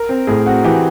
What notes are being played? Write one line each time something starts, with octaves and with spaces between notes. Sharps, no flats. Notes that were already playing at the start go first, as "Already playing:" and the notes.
Already playing: A#4
C4
A2 G#4
C4 F#4
E3 G4